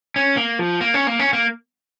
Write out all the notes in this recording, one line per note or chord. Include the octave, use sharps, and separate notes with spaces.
C#4
A#3
F3
A#3
C#4
A#3
C#4
A#3